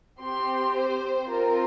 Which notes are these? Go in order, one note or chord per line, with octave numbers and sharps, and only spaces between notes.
C4 G4 C6
C5
C4 F4 A#4